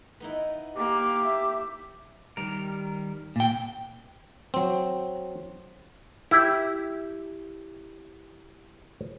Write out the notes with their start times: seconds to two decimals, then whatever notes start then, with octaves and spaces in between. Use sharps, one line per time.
0.20 B3 D#4 E4
0.76 A#3 G4
1.25 E5
2.37 D#3 G3 A#4
3.36 A#2 G5
4.54 F#3 C4
6.31 E4 G4